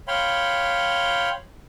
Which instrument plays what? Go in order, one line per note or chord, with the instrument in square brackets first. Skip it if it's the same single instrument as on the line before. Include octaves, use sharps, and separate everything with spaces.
[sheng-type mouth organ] C#5 F5 G5 B5 C6